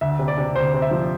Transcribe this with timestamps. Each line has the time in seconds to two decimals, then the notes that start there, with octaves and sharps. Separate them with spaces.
0.01 D2 E5
0.19 C3
0.28 D5
0.38 C3
0.56 D2 C5
0.74 C3
0.82 E5
0.91 F3